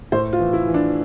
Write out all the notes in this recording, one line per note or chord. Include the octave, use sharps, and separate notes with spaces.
A2 C5
F4
E3
E4
E3
D4